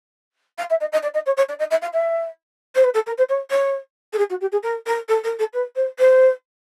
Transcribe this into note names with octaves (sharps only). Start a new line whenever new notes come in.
F5
E5
D#5
D#5
D5
D#5
C#5
C#5
D5
D#5
E5
F5
E5
C5
B4
A4
A#4
C5
C#5
C#5
A4
G#4
F#4
G4
G#4
A#4
A#4
A4
A#4
A4
B4
C5
C5